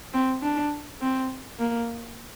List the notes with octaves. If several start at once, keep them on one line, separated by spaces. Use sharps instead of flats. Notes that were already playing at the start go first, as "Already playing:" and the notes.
C4
D4
C4
A#3